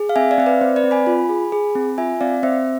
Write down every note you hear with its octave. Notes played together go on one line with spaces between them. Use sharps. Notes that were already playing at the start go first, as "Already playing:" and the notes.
Already playing: G#4
F5
C4 E5 G#5
D5 F5
C4 E5
B4 D5
C4 C5
B4 D5
C4
G#5 B5
F4
G#4
G#4
C4
F4 E5 G#5
C4 D5 F5
C4 C5 E5